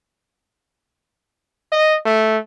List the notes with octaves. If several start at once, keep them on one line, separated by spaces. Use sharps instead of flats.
D#5
A3